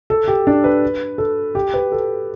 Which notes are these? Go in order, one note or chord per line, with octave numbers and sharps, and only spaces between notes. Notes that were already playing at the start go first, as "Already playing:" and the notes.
A4
G4
D4
B4
A4
G4
B4
A4